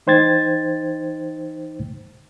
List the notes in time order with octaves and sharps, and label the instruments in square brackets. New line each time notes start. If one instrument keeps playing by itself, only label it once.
[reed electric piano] E3 D#4 C5 G5 G#6 A6